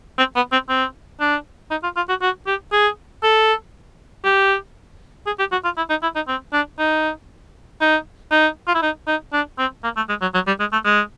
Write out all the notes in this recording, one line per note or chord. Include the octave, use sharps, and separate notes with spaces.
C4
B3
C4
C4
D4
D#4
F4
F4
F#4
F#4
G4
G#4
A4
G4
G#4
G4
F#4
F4
E4
D#4
E4
D#4
C4
D4
D#4
D#4
D#4
F4
E4
D#4
D#4
D4
C4
A#3
A3
G#3
F#3
F#3
G3
G#3
A3
G#3